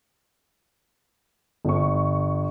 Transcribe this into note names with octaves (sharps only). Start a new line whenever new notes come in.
G1 C#6